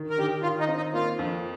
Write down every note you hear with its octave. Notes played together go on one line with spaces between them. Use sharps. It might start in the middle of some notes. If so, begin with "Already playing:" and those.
Already playing: D#3
A#4
D#3 G4
D#3 F4
D#4
C4
D#4
A#3 F4
F2